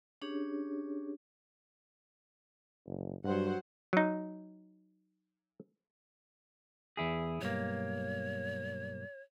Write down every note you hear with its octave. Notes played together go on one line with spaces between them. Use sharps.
C#4 D4 G4 G#4 C#5
F#1
G2 F#3 C5 F#5
F#3 D#4
E2 E4 G#4
B1 G2 A#3 C#5